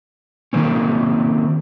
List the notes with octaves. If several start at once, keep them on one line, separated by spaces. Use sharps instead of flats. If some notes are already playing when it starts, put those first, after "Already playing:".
D#3 A#3 C4 C#4